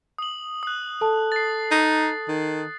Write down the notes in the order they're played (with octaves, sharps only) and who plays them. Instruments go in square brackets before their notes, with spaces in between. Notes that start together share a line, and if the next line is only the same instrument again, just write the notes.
[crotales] D#6 F#7
D#6 F#6
[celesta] A4 A5
[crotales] A6 C7
[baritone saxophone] D#4
D#3